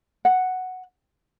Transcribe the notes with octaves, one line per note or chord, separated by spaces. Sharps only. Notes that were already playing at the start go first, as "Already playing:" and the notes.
F#5